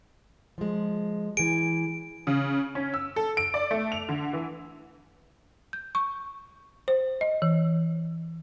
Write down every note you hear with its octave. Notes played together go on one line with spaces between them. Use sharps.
F3 G#3
E3 G#4 D7
C#3
C#4
E6
A4
D7
D5
A3
F7
D3
E3
G6
C#6
C5
D#5
E3